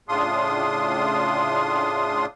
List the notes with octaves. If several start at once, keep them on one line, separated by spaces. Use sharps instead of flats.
A2 C#3 D4 F4 C6 D#6